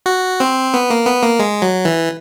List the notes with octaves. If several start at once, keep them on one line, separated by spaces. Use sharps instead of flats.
F#4
C4
B3
A#3
B3
A#3
G#3
F#3
E3